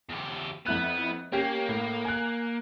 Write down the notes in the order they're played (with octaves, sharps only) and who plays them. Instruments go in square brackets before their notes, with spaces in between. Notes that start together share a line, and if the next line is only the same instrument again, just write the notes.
[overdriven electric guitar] E2 G4
[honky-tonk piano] F2 E4 F#6 [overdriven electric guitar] B3
[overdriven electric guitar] A#3 [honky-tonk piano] C#4 G4 C7
[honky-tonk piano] A2
G#5 F#6